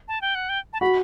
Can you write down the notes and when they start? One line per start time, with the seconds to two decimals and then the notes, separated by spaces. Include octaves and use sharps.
0.08 A5
0.21 G5
0.35 F#5
0.49 G5
0.73 A5
0.81 F#4 B5